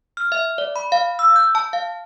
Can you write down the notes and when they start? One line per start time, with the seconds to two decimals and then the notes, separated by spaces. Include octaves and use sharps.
0.17 F6
0.32 E5
0.58 D5
0.76 B5
0.92 F5
1.19 E6
1.36 G6
1.55 A5
1.73 F5